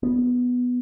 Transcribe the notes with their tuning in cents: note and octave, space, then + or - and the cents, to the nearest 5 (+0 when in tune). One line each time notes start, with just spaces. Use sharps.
B3 +0